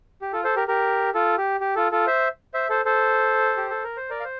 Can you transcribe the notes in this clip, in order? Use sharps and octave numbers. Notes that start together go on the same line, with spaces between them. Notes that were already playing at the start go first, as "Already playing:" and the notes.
G4
F4 A4
A4 C5
G4 A#4
G4 A#4
F4 A4
G4
G4
F4 A4
F4 A4
C5 E5
C5 E5
A4 C5
A4 C5
G4
A4
A#4
C5
A#4 D5
F5
C5